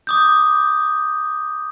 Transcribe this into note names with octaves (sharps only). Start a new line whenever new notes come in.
D6 D#6 G6